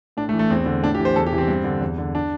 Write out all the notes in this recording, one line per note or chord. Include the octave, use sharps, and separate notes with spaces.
A2 D4
A3
E3
A3
E2 C4
D3
A2 D4
G4
E3
C5
E2 A4
G4
C3 E3
C4
G2
D3
E2
D3
D4